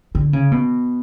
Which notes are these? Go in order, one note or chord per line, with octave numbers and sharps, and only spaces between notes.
D3
C#3
B2